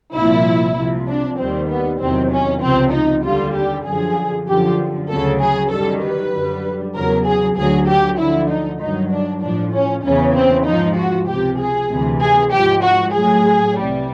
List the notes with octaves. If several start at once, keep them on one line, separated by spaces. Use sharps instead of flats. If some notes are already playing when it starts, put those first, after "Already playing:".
C2 A#2 F3 E4
C2 C3 F3
D4
D#2 D#3 G3 C4
B3
E2 C3 D#3 F#3 C4
C#4
C#2 C3 F3 C4
D#4
D#2 D3 G3 F4
G4
F#2 D3 F3 G#4
F#2 D3 F3 G4
D2 C#3 F#3 A4
G#4
F#2 D#3 G3 A4
B4
F#2 D3 G3
E2 C#3 F#3 A#4
G#4
D2 D3 F#3 G#4
G4
D2 D3 F3 E4
D#4
G2 D#3 F#3 D#4
D4
A2 F3 D4
C#4
E2 C#3 E3 C#4
C4
G#2 F3 D#4
F#4
C#2 C3 F3 G4
G#4
D2 C3 E3
G#4
G#2 F3 G4
F#4
A2 F#3 G#4
C2 C3 E3 G3